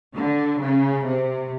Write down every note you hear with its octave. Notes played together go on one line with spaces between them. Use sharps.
D3
C#3
C3